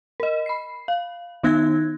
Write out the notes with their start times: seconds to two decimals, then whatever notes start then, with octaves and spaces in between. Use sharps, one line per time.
0.20 A#4 D#5
0.46 B5 C7
0.88 F5
1.43 D#3 B3 D#4 F#6 G#6 A#6